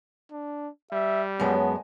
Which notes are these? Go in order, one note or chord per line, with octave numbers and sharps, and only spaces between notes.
D4
G3 E5
F#2 G#3 B3 C#5 A5